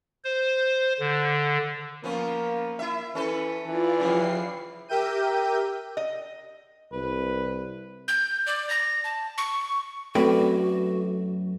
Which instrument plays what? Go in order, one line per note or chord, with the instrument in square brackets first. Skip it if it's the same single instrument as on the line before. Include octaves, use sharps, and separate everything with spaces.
[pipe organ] C5
D3
[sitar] F3 B3 C#4 [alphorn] A#3
[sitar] E4 E5
[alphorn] E3 [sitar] C#4 A4 B4
[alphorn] E3 [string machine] F4 D5
[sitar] C#3 F3 G3 [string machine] C7
[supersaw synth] G4 A#4 E5 G5 G6 D#7
[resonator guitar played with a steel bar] D#5
[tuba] C2 [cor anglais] B4
[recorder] G6
D5
A#6
A5
C#6
[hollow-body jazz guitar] F#2 B4 D5 [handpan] A3 [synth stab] C4 [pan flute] F#4